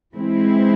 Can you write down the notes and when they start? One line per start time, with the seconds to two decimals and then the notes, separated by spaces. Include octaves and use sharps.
0.15 E3 G#3 C4 E4